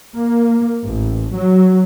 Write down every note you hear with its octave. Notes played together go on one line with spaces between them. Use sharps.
A#3
A1
F#3